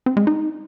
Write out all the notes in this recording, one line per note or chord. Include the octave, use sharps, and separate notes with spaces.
C4
G#3
D#4